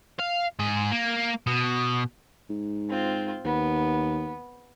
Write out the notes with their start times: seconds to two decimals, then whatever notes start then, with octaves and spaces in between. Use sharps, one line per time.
0.20 F5
0.59 G#2 G#4
0.92 A#3
1.47 B2
2.49 G#2
2.89 C4 F4
3.45 D#2 B3